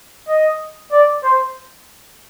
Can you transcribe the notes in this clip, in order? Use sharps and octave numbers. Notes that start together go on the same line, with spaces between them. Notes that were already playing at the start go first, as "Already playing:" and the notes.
D#5
D5
C5